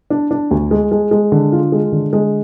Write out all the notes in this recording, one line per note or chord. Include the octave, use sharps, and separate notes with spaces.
D4
D4
D2
G#3
G#3
G#3
D3
F4
G#3
D3
G#3